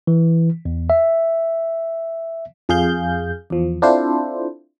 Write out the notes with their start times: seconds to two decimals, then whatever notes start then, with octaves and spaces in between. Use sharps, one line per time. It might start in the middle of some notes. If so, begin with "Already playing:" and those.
0.07 E3
0.65 E2
0.90 E5
2.69 F2 G#4 F5 G6
3.50 E2 F3
3.82 C4 D4 E4 F4 A4 C5